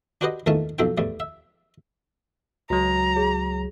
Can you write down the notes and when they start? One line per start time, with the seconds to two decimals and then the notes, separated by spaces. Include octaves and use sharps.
0.21 D4 F#4 G4 B4 C5 D#5
0.46 E2 A#2 D#3 A3 C#4 A5
0.79 B1 F2 C4 F4 A4 G5
0.98 E2 A2 G3
1.20 E5
2.70 C#2 F#3 F#4 A#5
3.16 G#4 C#5